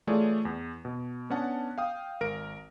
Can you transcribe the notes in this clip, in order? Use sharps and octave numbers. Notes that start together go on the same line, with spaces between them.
E3 A3 F4 G#4 C#5 D5
E2
B2
B3 C#4 D4 F#5 A5
F5 G5 D#6
G#1 A#4 D7